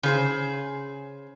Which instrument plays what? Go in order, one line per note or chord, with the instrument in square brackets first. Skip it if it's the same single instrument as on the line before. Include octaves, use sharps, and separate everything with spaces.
[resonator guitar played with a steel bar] C#3 G#4 C5